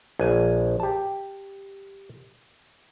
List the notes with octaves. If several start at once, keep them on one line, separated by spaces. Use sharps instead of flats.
A#1 G#5
G4 A5